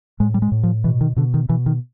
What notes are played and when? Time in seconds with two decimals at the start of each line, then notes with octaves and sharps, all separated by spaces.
0.20 A2 G#3
0.34 G3
0.42 G#3
0.52 A2
0.63 F3
0.84 B2 E3
1.01 D#3
1.16 B2 D3
1.34 D#3
1.49 B2 E3
1.66 D#3